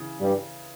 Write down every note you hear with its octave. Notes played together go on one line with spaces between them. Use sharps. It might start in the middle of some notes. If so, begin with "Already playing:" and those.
Already playing: C#3 E3
G2 G3